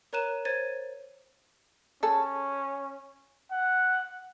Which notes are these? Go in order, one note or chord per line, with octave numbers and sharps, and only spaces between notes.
A#4 C#5 A#5 F#6 D#7 E7
C5 C#5 G#6 A6 D#7
C#4 G#4 A4
F#5